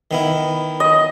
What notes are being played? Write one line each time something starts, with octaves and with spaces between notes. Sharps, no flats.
D#3 B3 E4
D#5